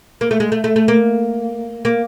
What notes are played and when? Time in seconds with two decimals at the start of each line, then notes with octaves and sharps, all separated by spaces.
0.21 A#3
0.31 A3
0.40 G#3
0.52 A3
0.64 A3
0.76 A3
0.88 A#3
1.85 A#3